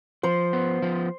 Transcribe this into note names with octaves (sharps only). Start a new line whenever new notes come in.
F3 C5
B3
F3